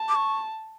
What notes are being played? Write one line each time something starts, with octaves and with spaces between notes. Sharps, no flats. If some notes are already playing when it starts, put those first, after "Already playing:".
Already playing: A5
D6
C#6